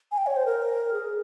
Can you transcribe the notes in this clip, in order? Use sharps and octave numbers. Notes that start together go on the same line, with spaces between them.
G#5
G5
C#5
C5
A#4
G#4